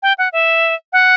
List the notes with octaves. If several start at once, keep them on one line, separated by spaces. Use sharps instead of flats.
G5
F#5
E5
F#5